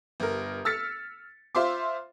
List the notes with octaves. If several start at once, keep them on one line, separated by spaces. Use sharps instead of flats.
G1 A#4
E6 F6 A6 B6 C#7
F4 C5 E5 C6 D6